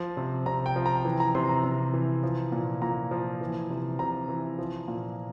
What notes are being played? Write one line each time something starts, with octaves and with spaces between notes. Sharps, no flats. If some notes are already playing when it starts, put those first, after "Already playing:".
Already playing: F3
C3
C3 A#5
G5
F3
A#5
E3
A#5
C3 C6
A#5
C3
E3
F3
A#2
A#2 A#5
F3
E3
C3
C3 A#5
E3
F3
A#2